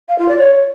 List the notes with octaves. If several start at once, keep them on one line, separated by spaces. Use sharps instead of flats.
F5
F4
D5
C#5